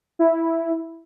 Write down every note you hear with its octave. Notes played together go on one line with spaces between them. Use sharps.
E4